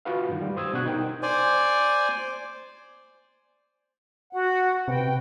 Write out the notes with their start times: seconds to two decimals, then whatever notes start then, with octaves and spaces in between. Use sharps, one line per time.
0.05 F4 F#4 B4 F5
0.29 G2 D#3
0.42 G3
0.56 C5 D#6 E6 G#6
0.73 B2 D4 F#4 F#6 G#6
0.86 D#4 A#4 G5
1.23 C5 D5 G#5
4.33 F#4 F#5
4.88 C3 B4 G5